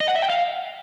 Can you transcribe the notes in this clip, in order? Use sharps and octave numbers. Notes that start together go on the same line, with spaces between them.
D#5
F#5
E5
G5
F5